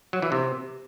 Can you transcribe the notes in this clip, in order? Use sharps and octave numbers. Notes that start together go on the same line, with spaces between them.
F#3
E3
C3